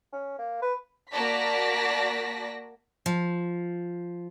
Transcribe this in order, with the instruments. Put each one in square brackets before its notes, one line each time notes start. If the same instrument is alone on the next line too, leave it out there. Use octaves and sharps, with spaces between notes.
[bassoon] C#4
A#3
B4
[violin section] A#3 F#4 D5 A5 A#6 B6
[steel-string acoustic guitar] F3